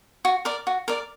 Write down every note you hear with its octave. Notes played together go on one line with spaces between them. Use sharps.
F#4
A#4 D5
F#4
A#4 D5